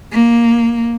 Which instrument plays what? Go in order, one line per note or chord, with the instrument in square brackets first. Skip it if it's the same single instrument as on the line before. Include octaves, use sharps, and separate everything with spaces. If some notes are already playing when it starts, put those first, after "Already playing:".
[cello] A#3